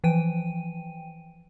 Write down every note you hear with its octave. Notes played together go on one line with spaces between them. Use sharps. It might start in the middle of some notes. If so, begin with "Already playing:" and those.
E3 F3 G5 D#7